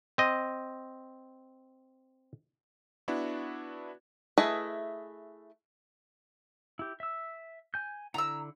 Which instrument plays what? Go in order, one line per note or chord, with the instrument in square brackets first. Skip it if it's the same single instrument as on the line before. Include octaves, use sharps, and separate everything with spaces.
[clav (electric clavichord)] C4 D#5
[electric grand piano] B3 D4 E4 F#4
[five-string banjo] A3 E4 G#4 B4 D#5
[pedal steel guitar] E4 G4
E5 E6
G#5 G6
[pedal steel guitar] D3 E4 [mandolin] A#5 E6